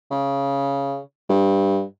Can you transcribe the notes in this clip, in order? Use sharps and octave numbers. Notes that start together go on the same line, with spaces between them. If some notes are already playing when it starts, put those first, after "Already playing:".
C#3
G2